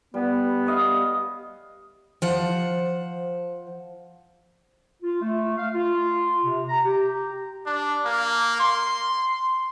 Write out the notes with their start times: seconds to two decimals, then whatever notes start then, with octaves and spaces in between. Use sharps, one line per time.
0.14 G3 B3
0.67 C#5 D#5 F5
2.22 F3 C5 F#5
5.03 F4
5.22 A3
5.57 F5
5.74 F4
6.45 C3
6.69 A#5
6.85 G4
7.66 D4
8.05 A#3
8.60 C6